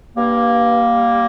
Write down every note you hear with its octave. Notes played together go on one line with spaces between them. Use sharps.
G2 G3 A#3